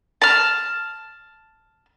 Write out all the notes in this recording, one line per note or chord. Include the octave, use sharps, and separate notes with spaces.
A5 F6